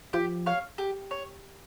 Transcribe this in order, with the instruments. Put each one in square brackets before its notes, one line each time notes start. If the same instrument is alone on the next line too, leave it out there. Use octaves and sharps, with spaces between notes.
[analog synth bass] F3 [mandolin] G4
[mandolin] C#5 F5
G4
C#5